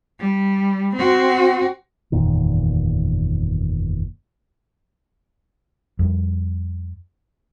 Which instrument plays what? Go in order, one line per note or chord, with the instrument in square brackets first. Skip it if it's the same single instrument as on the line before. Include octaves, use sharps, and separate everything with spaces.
[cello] G3
C4 F#4
[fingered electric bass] F#1 E2 A#2 D#3
F2 G3